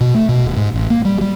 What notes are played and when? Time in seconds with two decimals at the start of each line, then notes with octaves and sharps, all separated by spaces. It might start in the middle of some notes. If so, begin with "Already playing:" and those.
0.01 B2
0.14 A3
0.29 B2
0.44 D#1
0.57 G#2
0.74 A1
0.90 A#3
1.05 G3
1.21 G3